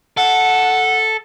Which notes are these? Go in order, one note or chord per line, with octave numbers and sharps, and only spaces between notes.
A4 F#5